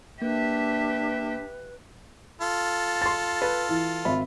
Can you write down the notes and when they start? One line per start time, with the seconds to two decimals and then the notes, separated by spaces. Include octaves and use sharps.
0.22 A#3 D4 G4 B4 E5
2.41 F4 A4
3.02 C6 A6
3.42 B4
3.69 E3
4.05 G#1 E5 B5